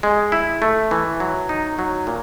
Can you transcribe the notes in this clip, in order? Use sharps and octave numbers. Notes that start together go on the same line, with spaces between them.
G#3
E4
A3
E3
F#3
D#4
F#3
A#2